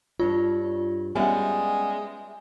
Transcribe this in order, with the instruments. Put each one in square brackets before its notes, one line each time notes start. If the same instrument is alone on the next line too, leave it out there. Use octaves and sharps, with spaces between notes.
[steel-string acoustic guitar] G2 D4 C#5 [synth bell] F4
[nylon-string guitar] G3 B3 C#4 [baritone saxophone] G#3 [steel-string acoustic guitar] G#4 F#5 [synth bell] E5 G#5